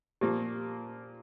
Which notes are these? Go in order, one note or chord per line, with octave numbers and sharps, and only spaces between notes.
A#2 F3 A#3 G4